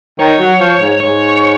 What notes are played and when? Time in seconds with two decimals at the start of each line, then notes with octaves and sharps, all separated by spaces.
0.19 D#3 C#5
0.39 F#3
0.60 F3
0.81 G#2
1.00 G#2 C#5